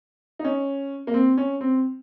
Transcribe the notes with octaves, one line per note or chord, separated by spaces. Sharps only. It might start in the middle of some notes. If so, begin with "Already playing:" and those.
D#4
C#4
A#3
C4
C#4
C4